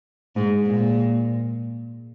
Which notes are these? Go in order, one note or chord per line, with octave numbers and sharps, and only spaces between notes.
G#2
A#2